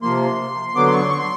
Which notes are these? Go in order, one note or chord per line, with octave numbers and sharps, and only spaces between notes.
C3 F3 A#3 C6
D3 F#3 B3 D6
C6
C#6
C6
C#6
C6